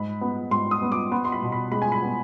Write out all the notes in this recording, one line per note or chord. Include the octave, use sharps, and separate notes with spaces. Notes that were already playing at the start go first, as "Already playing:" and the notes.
Already playing: G#2 B5
B3
G#2 C6
D#6
B3
D6
B3 C6
C6
B5
B2
B5
G#3 B5
G#5
B5
B3